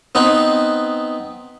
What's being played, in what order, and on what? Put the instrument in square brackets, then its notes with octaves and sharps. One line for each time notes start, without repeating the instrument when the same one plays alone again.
[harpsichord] B3 C4 D#4 B4